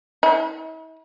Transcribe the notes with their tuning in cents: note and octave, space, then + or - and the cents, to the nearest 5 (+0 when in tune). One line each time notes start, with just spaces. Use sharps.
E4 -45